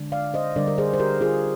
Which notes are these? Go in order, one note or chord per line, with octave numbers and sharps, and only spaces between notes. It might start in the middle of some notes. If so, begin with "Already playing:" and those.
Already playing: D3 G#3 D4
D5 F5
C5 D#5
D3 G3 D4 A#4 D5
A#4
G#4 C5
C5
G4 A#4
F4 G#4